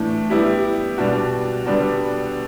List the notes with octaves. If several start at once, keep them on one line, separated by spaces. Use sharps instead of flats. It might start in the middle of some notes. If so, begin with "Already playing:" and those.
Already playing: A2 E3 A3 D4
G3 B3 E4 G4
B2 G3 D4 F#4
D3 G3 B3 D4 F#4